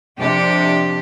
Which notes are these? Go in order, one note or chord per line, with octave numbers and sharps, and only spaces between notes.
F2 C3 D4 G4